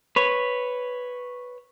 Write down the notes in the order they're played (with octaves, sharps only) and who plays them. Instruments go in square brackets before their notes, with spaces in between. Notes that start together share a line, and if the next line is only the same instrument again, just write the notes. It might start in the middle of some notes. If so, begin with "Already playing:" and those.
[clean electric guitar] B4 C#5